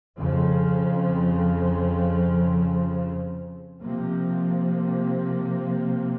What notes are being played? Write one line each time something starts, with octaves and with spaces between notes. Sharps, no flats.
F2 C#3 F3
C3 F3 A#3